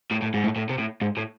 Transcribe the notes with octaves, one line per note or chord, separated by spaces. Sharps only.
A2
A2
G#2
A2
A2
C3
A2
G#2
A2